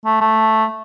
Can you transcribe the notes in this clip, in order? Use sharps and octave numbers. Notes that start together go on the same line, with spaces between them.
A3
A3